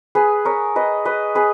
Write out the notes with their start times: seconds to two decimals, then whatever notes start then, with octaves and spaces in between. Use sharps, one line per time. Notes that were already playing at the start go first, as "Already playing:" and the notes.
0.15 G#4 B4
0.45 A#4 C#5
0.76 B4 D#5
1.05 B4 D#5
1.35 G#4 B4